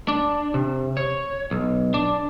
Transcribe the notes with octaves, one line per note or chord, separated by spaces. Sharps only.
D4
C3
C#5
B1
D4